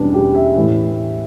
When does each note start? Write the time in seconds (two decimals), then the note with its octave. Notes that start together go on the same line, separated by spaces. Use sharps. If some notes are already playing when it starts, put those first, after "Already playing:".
Already playing: E2 B2 G3 B3 C#4 D4
0.14 G4
0.35 E5
0.56 A2 E3